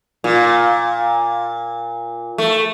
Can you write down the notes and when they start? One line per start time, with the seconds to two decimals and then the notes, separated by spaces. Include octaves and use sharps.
0.24 A#2
2.38 A3